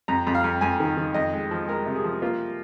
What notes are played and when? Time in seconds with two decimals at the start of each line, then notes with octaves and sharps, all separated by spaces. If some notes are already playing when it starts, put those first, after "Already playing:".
0.08 F2 A#5
0.27 F2
0.35 F5
0.44 F2
0.61 F2 G#5
0.80 D#3
0.97 D#3
1.14 F2 D#5
1.33 G#3
1.51 F3
1.68 G#3 A#4
1.86 C3
1.96 G#4
2.04 F3
2.22 A#3 F4